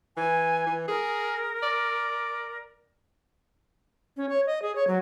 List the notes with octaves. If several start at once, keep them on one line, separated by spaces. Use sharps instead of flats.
E3 G#5
E3
G#4 A#4
D5
C#4
C#5
D#5
G#4
C#5
F#3